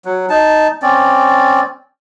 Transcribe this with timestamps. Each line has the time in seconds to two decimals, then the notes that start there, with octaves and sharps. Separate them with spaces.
0.05 F#3
0.30 D#4 A5
0.82 C4 C#4 D5